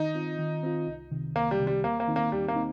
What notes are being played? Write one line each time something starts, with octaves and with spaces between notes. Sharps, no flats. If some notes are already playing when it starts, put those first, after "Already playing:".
Already playing: D#3 D#4
C4 F4
D#3
C4 F4
C2
C3 D#3
C2 A#3
G3
C3 D#3
G3
D#2 A#3
A#3
D#3 C4 D#4
A#3
D#2 G3
A#3
C4 D#4